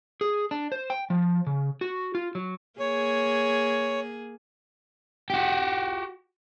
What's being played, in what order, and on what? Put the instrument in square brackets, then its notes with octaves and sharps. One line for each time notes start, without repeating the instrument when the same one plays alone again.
[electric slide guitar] G#4
D4
C5
G5
F3
C#3
F#4
F4
F#3
[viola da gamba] A#3 G#4 [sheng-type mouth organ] C#5
[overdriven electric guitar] F#4 G4